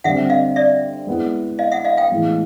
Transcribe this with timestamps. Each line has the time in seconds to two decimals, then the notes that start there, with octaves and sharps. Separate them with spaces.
0.04 D3 G3 C4 E5 F#5
0.30 D#5 F5
0.56 D5 E5
1.07 G#3 B3 E4
1.59 D#5 F5
1.72 E5 F#5
1.84 D#5 F5
1.97 F5 G5
2.10 A2 E3 G#3 B3